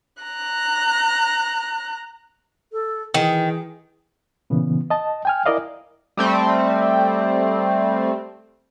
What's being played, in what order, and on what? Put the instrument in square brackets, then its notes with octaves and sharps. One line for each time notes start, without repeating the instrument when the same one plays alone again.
[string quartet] A#5 F#6
[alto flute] A4
[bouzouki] D#3 [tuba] E3 [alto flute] G#4
[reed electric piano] A#2 C#3 E3 B3
D#5 A5
G5 G#5 F6
E4 A#4 D5 D#5 F5
[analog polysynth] G3 A3 C4